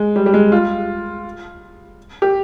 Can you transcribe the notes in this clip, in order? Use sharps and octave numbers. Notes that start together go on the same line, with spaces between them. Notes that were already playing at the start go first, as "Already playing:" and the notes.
Already playing: G#3
G3
G3
G#3
F4
G4